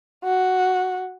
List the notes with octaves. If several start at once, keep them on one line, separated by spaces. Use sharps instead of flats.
F#4